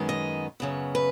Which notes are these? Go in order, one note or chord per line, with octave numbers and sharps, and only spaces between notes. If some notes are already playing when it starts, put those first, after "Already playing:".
Already playing: F#2 D#3 G#3 B3
D#5
F#2 C#3 B3
B4